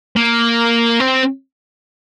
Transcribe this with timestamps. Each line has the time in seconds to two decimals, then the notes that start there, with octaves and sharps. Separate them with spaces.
0.17 A#3
1.00 C4